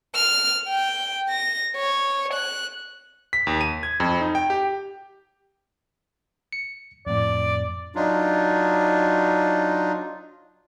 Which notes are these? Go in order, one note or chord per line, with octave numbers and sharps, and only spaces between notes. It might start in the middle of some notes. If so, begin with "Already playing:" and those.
F6
G5
A#6
C#5
F#6
B6
D#2
D#7
G#6
F2
D#4
G5
G4
C#7
F2 A2 D5
F#3 D4 D#4 F4